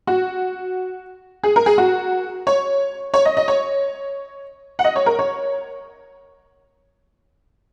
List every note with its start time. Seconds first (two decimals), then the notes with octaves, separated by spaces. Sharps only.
0.07 F#4
1.43 G#4
1.56 A#4
1.66 G#4
1.78 F#4
2.47 C#5
3.14 C#5
3.25 D#5
3.37 D#5
3.48 C#5
4.79 F#5
4.84 D#5
4.96 C#5
5.06 A#4
5.19 C#5